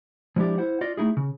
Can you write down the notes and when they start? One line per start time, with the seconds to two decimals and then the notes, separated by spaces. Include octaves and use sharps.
0.36 F3 G#3 D4 E4 G4 D5
0.58 E4 C5 F#5
0.81 F4 D5 D#5
0.97 A3 D#4 E4 G#4
1.17 C#3